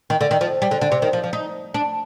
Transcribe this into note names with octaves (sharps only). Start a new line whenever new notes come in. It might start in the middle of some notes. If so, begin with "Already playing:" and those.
D#3
D3
D#3
F3
G3
D3
D3
C3
D#3
F3
F3
D#4
D4